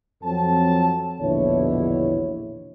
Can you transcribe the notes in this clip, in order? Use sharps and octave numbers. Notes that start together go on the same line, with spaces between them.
F2 F3 F#3 C4 A4 A5
A#1 E2 B2 D3 E4 C#5